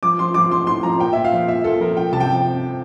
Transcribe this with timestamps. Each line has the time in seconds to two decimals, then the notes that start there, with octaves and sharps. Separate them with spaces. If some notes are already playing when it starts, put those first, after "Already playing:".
0.03 F3 D6
0.19 F3 C6
0.34 F3 D6
0.51 F3 C6
0.67 A2 C6
0.83 F3 A#5
0.99 A#2 G5
1.13 A#2 E5
1.25 F5
1.32 F3
1.48 A#2 E5
1.64 A#2 A4
1.80 F3 A#4
1.97 F3 G5
2.12 C3 A5
2.20 G5
2.30 F3